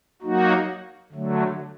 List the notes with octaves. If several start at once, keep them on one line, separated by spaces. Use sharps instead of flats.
F#3 A#3 D#4 F#4
D3 F#3 A3